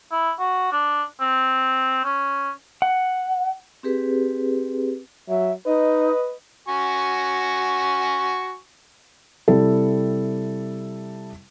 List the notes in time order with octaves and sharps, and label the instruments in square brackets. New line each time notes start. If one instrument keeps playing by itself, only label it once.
[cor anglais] E4
F#4
D4
C4
C#4
[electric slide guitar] F#5
[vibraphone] C4 G4 G#4 B4
[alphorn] F#3 [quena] E5
[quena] D#4 [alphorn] B4 [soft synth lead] D#5
[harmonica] F#4 G#5 C#6
[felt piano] C3 G3 E4 A4